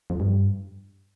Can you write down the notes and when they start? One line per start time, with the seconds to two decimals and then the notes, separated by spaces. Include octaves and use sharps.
0.10 F2
0.20 G2